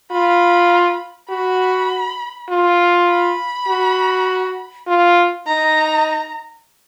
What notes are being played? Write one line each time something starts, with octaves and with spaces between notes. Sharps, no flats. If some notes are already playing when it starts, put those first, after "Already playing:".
F4 B5
F#4 B5
F4
B5
F#4
F4
D#4 A#5